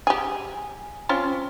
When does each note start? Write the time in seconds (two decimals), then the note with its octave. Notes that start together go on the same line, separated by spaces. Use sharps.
0.07 G4 G#4
1.09 C4 C#4 F4